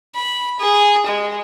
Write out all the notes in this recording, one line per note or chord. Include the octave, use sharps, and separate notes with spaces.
B5
G#4
G#3